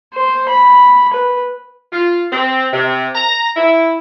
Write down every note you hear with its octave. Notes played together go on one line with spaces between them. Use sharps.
C5
B5
B4
F4
C4
C3
A#5
E4